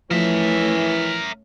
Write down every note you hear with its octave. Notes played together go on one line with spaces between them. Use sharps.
E3 F3 A3 C#4 A#4 E5